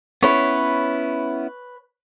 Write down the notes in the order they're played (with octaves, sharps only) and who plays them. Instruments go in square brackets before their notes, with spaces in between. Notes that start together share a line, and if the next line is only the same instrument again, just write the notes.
[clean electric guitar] B3 C#4 E4 [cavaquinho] B4 C#5